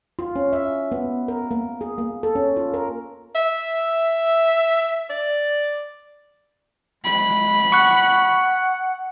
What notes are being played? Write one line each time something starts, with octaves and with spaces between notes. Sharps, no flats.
F4
C#4
E5
B3
A#4
A#3
G#4
A#3
A4
C#4
F4
A#4
E5
D5
G#3 B5
F#5 C#6 F#6